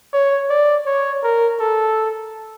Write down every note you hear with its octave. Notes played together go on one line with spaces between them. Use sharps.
C#5
D5
C#5
A#4
A4